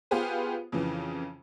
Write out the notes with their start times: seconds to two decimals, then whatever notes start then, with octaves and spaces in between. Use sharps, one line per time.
0.11 B3 F4 G4 G#4 B4 C5
0.72 F2 C#3 E3